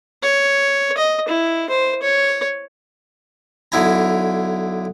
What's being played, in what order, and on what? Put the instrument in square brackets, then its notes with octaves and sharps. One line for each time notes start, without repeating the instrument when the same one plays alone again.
[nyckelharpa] C#5
D#5
E4
C5
C#5
[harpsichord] B1 D3 E4 G#5 A#5